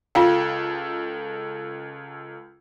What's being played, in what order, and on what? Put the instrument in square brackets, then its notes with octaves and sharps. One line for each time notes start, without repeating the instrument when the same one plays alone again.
[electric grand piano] C#2 A4 [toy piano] F4 F5 G5